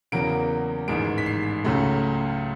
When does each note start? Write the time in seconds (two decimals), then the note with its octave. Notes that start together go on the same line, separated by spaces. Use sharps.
0.12 E2 C#3 F#3 A#3 D7
0.88 A1 G#2 D#3 G#3 D7
1.18 B6
1.26 C7
1.64 C#2 C#3 F#3 A3